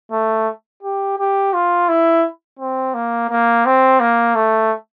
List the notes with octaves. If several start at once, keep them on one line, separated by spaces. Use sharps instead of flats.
A3
G4
G4
F4
E4
C4
A#3
A#3
C4
A#3
A3